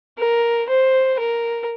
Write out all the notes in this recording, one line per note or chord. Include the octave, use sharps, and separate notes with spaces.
A#4
C5
A#4